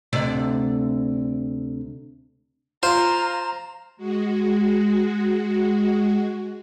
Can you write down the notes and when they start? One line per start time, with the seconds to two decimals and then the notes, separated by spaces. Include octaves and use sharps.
0.13 D2 C3 D5
2.83 F4 C5 A#5
3.97 G#3 F#4